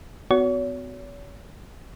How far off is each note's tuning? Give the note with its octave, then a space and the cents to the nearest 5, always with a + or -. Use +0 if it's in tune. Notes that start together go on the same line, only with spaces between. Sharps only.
B3 +40 F#4 +0 C#5 +40